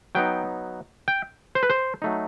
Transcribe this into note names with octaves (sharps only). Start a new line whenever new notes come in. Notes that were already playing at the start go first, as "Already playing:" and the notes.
F#3 B3 D#4 G5
G5
C5
B4
C5
F#3 A3 D#4